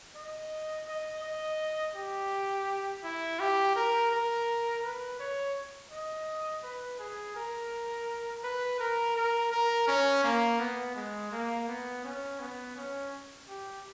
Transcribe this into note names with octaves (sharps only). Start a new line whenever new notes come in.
D#5
D#5
D#5
G4
E4
G4
A#4
A#4
B4
C#5
D#5
B4
G#4
A#4
B4
A#4
A#4
A#4
C#4
A#3
B3
G#3
A#3
B3
C#4
B3
C#4
G4